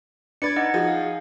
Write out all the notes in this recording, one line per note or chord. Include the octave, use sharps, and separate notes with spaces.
D4 B4 D5 G#6 A6 C#7
D#4 D#5 F#5
F3 F#4 G#4
F5